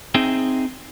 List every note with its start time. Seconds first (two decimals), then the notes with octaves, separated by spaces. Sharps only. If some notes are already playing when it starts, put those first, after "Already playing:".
0.14 C4 D#4 G#4 E5 G5